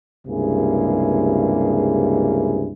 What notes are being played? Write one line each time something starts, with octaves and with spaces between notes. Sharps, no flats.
C#2 G2 C3 A#3 E4 G#4